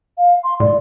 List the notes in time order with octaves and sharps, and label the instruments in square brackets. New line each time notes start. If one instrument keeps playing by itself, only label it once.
[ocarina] F5
C6
[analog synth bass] A2 [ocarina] D5